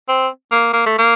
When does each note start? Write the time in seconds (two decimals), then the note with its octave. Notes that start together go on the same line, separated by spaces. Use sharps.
0.09 C4
0.52 A#3
0.73 A#3
0.86 A3
0.99 A#3